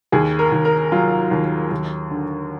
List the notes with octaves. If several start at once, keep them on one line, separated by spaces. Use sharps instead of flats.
D#2 G#4
A#4
D#2
A#4
F#3 F4
D#2
D#2
D3